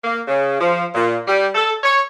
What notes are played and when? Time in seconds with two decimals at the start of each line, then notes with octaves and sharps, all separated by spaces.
0.04 A#3
0.28 C#3
0.60 F3
0.95 A#2
1.28 G3
1.55 A4
1.83 C#5